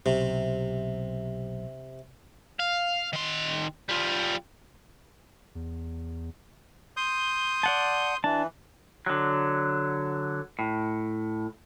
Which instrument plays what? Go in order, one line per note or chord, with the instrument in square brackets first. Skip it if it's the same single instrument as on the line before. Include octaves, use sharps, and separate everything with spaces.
[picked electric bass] B1 [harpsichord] C3
[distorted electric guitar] F5
D#3 C6
G3 F4
[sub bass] E2
[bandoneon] C6 D#6 G6
[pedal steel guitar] D5 F#5 A5
[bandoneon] E3 [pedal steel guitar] D4 A5
[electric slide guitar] D3 F#3
A2